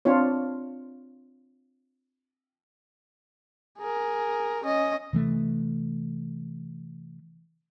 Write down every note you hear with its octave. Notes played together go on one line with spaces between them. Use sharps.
C4 D4 F4 C#5
G#4 A#4
C#4 D#5
C3 E3 A3